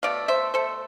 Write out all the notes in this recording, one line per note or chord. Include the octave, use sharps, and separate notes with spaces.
B2 A3 D5 F5
C5 E5
A4 C5